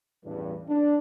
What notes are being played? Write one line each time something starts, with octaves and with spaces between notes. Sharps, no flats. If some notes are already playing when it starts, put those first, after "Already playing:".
A1 E2 G2
D4